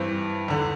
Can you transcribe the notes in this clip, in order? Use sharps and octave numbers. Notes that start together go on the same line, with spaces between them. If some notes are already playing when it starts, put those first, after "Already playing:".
Already playing: G2 E3 C4
E2 D3